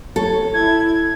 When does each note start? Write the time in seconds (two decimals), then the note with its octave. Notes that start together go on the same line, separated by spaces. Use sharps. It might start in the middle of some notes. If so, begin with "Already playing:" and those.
0.16 A4 C#5
0.54 E4 G#6